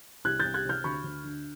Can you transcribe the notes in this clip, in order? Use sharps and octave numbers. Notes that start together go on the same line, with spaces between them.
C2 F#6 G#6
G6 A6
C2
F#6 G#6
C3 F6 G6
D2 B5 C#6
D2
D3